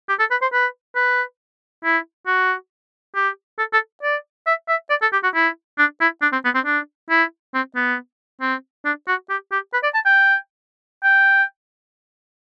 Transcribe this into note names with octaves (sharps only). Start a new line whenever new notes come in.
G4
A4
B4
C5
B4
B4
E4
F#4
G4
A4
A4
D5
E5
E5
D5
A4
G4
F#4
E4
D4
E4
D4
C4
B3
C4
D4
E4
C4
B3
C4
D4
F#4
G4
G4
B4
D5
A5
G5
G5